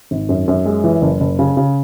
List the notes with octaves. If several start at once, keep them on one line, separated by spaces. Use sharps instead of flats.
G#1
F#2
F#2
G#3
E3
F#1
F#1
C#3
C#3